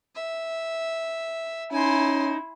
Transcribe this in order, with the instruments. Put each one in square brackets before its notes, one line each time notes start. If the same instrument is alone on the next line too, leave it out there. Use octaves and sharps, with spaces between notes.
[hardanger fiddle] E5
[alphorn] C#4 [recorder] D#4 [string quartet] E4 [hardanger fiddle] G#5 C6